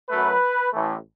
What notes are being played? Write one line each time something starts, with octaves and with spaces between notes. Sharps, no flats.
F#2 F#3 A3 B4
A1 A2 E3 A3